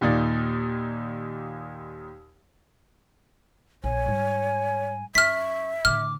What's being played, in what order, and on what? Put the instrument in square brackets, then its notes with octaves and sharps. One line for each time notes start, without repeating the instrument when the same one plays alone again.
[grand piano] D#2 A#2 D#4 D5 A6
[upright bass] A#1 [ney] C#5 [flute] G#5
[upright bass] G#2 G3
[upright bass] F#2 [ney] E5 [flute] C#6 [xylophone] F6 B6
[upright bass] A2 D3 [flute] D6 [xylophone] F6